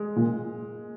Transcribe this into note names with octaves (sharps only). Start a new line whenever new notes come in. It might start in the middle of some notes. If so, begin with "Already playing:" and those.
Already playing: G#3
A#2